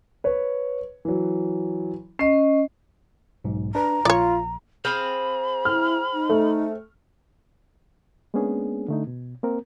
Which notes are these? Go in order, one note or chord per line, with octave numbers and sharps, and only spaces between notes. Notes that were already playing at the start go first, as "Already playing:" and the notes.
B4 C#5
E3 F#3
C#4 D#5 C7
B1 G#2
D4 B4 A#5
A#1 F4 C#5 D5
C4 G#4 F5 B5
E4 F6
D#4
A3
G#3 A#3 B3 C#4 D4 G#4
D3 A3 D#4
B2
A#3 C4 A#4